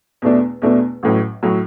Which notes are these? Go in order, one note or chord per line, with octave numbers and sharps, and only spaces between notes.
E2 B2 A3 D4
E2 B2 A3 D4
A1 A2 F#3
A2 F#3